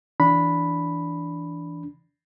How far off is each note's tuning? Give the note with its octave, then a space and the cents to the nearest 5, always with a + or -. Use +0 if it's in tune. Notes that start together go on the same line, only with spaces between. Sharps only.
E3 +0 D4 -15 B5 +0